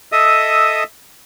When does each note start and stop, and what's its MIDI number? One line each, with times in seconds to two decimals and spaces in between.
0.12 0.84 69
0.12 0.84 75
0.12 0.84 76
0.12 0.84 87